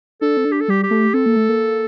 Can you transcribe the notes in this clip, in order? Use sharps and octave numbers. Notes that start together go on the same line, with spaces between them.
D4 A4
C4
D4
G4
A4
G3 G4
G4
A3
C4 A4
A#3
A3
A#3